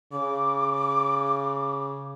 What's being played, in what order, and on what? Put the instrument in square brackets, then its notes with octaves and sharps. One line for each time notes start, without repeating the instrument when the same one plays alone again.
[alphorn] C#3 [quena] D6